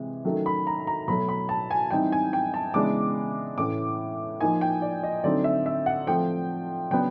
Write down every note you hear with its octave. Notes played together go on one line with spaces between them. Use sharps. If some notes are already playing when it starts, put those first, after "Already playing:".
Already playing: C3 E3 G#3
D#3 F#3 A3 C#4
B5
A#5
A#5
B2 F#3 A3 B5
B5
A5
G#5
E3 G3 C4 D#4 G5
G#5
G5
A5
C#3 E3 G#3 B3 D4 D6
A2 E3 A3 C#4 D6
F3 A#3 D#4 G#5
G5
D5
D#5
D3 F#3 A3 C4 D#4 D5
E5
E5
F#5
F3 A3 C4 G5
C#3 F#3 B3 D4 G5